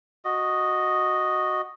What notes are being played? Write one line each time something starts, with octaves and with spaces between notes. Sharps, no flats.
F#4 D#5